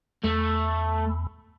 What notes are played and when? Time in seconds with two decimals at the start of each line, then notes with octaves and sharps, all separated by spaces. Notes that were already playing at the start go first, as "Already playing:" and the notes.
0.24 E2 A3